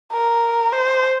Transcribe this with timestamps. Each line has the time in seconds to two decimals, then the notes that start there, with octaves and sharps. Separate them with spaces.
0.12 A#4
0.73 C5